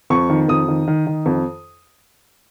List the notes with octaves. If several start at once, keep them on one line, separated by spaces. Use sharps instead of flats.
F2 C#6
D#3
F2 D#6
D#3
D#3
D#3
F2